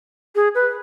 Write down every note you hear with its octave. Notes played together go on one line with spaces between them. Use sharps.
G#4
B4